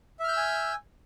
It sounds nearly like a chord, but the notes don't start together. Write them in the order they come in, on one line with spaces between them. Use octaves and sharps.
E5 F6 G6 E6 G#5